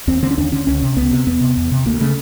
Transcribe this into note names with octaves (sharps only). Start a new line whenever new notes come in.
D#2 C4
D3 C4
C#4
D#2 D4
D3 C#4
C#2 C#4
C3
C#2 B3
C3
E2 B3
C3
E2
C3
D2 A#3
C#3 A3